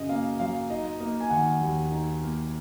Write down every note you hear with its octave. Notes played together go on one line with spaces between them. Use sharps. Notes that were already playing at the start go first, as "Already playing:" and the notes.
Already playing: F#2 C#3 F#3 D#5
A#3 F5
F#3 F5
D#4 D#5
A#3 D#5
G#5
D#3 F#5
D#2
D#4
A#3